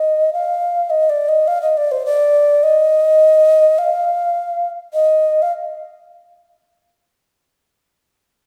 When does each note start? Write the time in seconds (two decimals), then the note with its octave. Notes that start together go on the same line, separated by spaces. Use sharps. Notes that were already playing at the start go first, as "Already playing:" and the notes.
Already playing: D#5
0.33 F5
0.90 D#5
1.10 D5
1.29 D#5
1.48 F5
1.62 D#5
1.77 D5
1.92 C5
2.06 D5
2.63 D#5
3.79 F5
4.94 D#5
5.42 F5